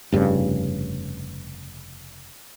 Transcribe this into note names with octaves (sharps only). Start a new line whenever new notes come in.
F1 G2 A#2 C#3